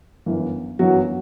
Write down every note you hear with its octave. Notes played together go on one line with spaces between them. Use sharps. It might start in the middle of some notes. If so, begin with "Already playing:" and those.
G1 F#2 E3
G1 F#2 E3 F#3 F#4